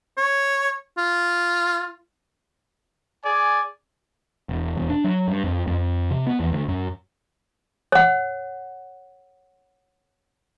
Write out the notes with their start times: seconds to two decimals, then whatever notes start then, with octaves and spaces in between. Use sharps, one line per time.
0.18 C#5
0.98 F4
3.24 G#4 D5 G#5
4.49 E1
4.77 E1
4.90 D4
5.04 F#3
5.28 G2
5.44 F2
5.67 F2
6.11 C3
6.27 B3
6.40 E2
6.52 D2
6.68 F#2
7.92 C#5 F#5